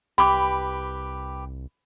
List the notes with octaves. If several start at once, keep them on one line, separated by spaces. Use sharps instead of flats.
C2 G4 B4 B5 D6